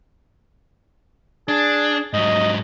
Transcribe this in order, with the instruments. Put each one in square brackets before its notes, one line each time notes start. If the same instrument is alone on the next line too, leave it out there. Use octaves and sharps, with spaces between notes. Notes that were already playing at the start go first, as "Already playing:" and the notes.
[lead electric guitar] D4 [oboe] G#4
[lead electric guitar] G#2 F#3 [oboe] D#5